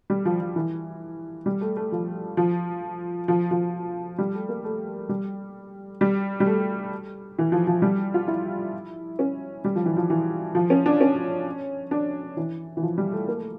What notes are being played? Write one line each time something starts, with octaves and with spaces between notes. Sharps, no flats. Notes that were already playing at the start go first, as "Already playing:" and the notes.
G3
F3
F3
E3
G3
A3
A3
F3
F3
F3
F3
G3
A3
A#3
A3
G3
G3
G3
A3
E3
F3
F3
G3
F4
E4
C#4
G3
F3
E3
F3
E3
F3
C#4
D4
C#4
D4
E3
E3
F3
G3
A3
A#3
A3